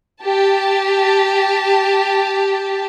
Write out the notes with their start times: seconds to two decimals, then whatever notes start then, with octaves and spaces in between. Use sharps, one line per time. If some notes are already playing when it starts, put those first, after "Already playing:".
0.23 G4 A5